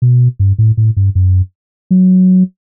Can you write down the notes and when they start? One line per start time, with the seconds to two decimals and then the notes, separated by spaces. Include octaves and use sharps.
0.02 B2
0.39 G2
0.58 A2
0.77 A2
0.97 G2
1.15 F#2
1.91 F#3